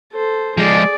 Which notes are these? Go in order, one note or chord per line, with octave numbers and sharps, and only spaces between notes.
A4 C5
F3 G#3 G#4 D5